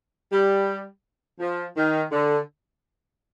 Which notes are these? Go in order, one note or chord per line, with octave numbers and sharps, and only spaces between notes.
G3
F3
D#3
D3